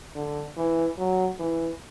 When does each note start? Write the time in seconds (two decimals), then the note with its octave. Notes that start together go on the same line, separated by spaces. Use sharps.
0.15 D3
0.56 E3
0.98 F#3
1.39 E3